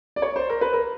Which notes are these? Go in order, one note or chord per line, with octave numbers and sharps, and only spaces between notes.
D5
C#5
C5
A#4
B4
A#4